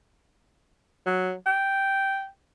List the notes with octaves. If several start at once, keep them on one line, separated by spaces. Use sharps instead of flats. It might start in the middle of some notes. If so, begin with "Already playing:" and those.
F#3
G5